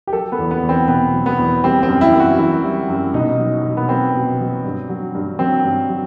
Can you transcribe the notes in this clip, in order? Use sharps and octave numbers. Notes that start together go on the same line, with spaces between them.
G4
F#3 A4
B3
E2
B3
E2
C4
B2 B3
F#3
B3
E2
G3 C4
C4
F#2
E4
F#2
F#4
E3 E4
G3
F#2
B2 D#4
F#3
B2
B3
F#3 C4
B2
F#3
G2
F#3
G2
F#3 C4
G2
F#3